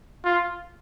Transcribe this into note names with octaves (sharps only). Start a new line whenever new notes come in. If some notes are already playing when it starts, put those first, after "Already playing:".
F4